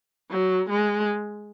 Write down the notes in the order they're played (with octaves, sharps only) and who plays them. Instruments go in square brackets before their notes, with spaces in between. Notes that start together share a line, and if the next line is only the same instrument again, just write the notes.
[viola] F#3
G#3